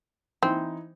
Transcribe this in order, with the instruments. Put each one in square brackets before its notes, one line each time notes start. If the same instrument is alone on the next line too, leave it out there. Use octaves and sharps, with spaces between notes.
[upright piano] E3 D#4 [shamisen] C4